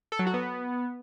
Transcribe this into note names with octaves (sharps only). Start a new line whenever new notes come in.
A4
F#3
F#4
B3